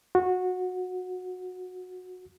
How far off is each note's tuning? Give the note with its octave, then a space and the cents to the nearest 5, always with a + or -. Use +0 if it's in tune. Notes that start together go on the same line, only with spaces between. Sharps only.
F#4 -15